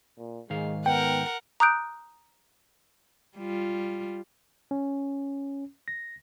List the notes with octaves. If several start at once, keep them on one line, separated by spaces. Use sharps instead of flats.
A#2
G#2 D#3 G#3 F5
B3 A#4 F#5 G5
A#5 D6 D#6 F#6 G6 D7
G3 F4
C#4
A#6